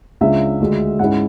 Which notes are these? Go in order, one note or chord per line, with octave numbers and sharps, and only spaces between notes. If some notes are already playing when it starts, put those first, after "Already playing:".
C#2 C#3 G#3 D4 E5
D2 D3 G#3
G#2 G#3 C#4 E4 F#5